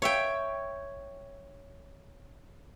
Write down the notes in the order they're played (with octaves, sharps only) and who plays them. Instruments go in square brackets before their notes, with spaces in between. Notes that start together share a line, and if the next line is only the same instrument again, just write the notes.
[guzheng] C#5 E5 G5